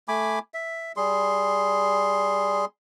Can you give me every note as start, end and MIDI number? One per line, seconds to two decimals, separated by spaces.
0.08 0.39 57
0.08 0.39 80
0.08 0.39 83
0.08 0.39 86
0.54 0.92 76
0.97 2.65 55
0.97 2.65 68
0.97 2.65 84